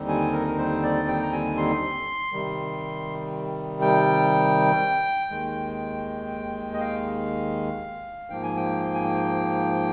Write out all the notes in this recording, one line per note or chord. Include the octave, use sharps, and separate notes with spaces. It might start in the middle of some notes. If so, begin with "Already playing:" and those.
Already playing: D#2 D3 G3 C4 D#4
G#5
A#4
A#4
C5
D5
G5
A#5
G#5
C6
C3 D#3 G3
G5
D#2 D#3 G#3
D#5
F5
G#2 F3 A#3 G5
G#5
G5
G#5
G5